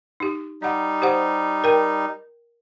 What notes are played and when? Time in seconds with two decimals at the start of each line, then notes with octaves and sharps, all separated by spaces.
0.20 D#4 G4
0.62 G3 D#4 D#5 F#5
1.02 G4 C5 F#5
1.64 A#4 G5